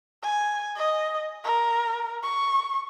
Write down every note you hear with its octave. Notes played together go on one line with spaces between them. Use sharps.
G#5
D#5
A#4
C#6